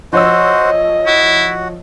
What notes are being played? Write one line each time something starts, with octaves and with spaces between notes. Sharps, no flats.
F3 F#4 C5 C#5 D#5 E6
E4 F#4